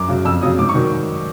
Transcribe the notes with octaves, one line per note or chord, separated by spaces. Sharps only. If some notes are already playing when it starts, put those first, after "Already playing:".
Already playing: F#2 D6
C#3 F#3
F2 E6
C#3 F#3 D#6
G#2 D6
C#6
D#3 F#3